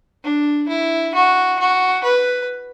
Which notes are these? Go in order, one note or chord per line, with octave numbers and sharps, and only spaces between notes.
D4
E4
F#4
F#4
B4